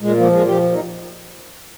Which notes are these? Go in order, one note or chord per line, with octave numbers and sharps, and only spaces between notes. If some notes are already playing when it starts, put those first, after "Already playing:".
A#2 G#3
F3 A#3
A#2 G#3
F3 G4
A#2
D#4